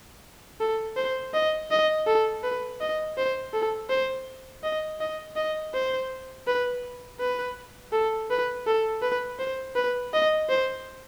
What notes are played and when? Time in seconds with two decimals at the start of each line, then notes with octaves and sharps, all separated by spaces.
0.60 A4
0.97 C5
1.34 D#5
1.71 D#5
2.07 A4
2.44 B4
2.81 D#5
3.18 C5
3.54 A4
3.90 C5
4.63 D#5
5.01 D#5
5.36 D#5
5.74 C5
6.47 B4
7.20 B4
7.93 A4
8.30 B4
8.67 A4
9.03 B4
9.39 C5
9.76 B4
10.14 D#5
10.49 C5